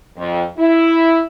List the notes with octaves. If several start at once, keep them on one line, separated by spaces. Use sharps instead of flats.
F2
E4